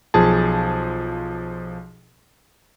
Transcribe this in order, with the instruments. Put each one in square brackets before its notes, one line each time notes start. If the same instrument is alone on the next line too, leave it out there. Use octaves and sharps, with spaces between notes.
[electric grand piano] B1 F3 G#4 A5